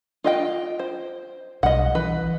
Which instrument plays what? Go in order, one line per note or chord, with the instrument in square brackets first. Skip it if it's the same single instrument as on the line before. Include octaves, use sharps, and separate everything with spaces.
[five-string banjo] F4 D#5 G5
C5
[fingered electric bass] B1 G3 [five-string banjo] D#5 F#5
[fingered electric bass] E3 [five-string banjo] B4